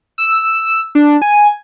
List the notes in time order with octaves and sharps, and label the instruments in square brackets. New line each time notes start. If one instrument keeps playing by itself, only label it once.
[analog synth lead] E6
D4
G#5